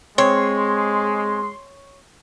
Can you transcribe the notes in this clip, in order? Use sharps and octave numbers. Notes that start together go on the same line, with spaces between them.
G#3 C4 C#5 C6